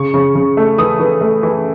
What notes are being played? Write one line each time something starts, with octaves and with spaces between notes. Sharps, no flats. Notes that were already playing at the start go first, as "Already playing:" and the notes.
Already playing: C#3 C#6
C#3
C#3
A3
E3 D#6
E3
A3
E3